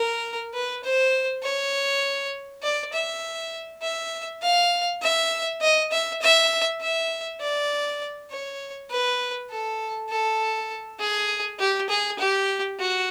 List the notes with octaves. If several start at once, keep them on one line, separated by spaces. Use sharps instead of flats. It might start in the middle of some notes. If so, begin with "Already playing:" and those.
Already playing: A#4
B4
C5
C#5
D5
E5
E5
F5
E5
D#5
E5
E5
E5
D5
C#5
B4
A4
A4
G#4
G4
G#4
G4
F#4